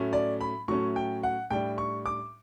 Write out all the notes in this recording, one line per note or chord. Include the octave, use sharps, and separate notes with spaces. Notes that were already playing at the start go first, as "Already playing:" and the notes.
Already playing: A2 F#3 A3 C#4
D5
B5
A2 F#3 A3 C#4 C#6
G5
F#5
A2 G3 D4 G5
C#6
D6